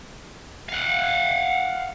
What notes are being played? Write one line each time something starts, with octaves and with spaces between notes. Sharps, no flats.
F5 F#5